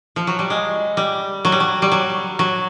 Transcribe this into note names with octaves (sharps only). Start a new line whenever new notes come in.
F3
F#3
G3
G#3
G3
F#3
G3
F#3
G3
F#3
F#3